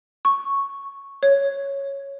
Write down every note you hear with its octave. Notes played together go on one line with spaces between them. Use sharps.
C#6
C#5